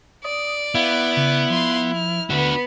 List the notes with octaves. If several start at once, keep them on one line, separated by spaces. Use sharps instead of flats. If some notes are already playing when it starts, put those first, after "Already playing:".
D5 D#6
B3 E4 F5
C#3
F3 F5 C6
F6
D3 B3 D4 F#4 B4